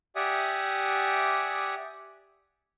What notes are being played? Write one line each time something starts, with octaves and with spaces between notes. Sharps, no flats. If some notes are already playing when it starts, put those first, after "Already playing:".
G4 D5 E5 F#5 G#5 D#6